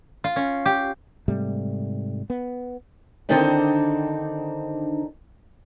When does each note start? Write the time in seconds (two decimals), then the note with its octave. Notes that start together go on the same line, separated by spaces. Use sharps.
0.24 F4
0.36 C#4
0.65 G4
1.28 G#2 C3 G3 A3
2.30 B3
3.29 D3 D#3 C4 D4 D#4